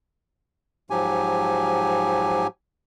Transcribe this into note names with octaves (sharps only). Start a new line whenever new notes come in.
G#2 F3 F#3 G4 G#5